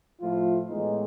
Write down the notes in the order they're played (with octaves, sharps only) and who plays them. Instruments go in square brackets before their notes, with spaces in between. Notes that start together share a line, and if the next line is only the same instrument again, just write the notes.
[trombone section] A2 F3 A3 F4
A2 E3 G#3 B3 D#4